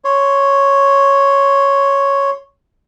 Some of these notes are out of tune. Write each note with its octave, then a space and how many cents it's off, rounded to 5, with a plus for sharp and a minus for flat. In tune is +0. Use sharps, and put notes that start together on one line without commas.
C#5 +0 C6 +0